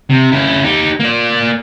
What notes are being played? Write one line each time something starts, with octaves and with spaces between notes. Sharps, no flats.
C3
C#3 E4
D#4 G4
A#3 D5